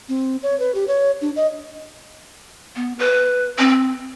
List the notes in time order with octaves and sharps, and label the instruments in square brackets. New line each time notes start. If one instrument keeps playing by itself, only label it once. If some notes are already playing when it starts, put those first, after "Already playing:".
[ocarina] C4
C#5
B4
G4
C#5
D4
D#5
[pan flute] B3
B4
C4